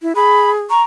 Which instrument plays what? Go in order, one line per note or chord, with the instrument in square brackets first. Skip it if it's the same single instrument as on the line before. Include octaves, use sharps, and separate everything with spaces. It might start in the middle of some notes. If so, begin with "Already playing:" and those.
[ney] E4
[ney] G#4 [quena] B5
[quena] A#5 [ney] C#6